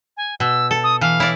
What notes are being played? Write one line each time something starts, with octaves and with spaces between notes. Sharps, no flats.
G#5
B2 E6
A4
D#6
E3 F5
E4 D5